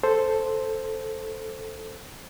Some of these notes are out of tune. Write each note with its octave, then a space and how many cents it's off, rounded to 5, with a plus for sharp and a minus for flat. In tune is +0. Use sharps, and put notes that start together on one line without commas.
A4 +0 C5 +0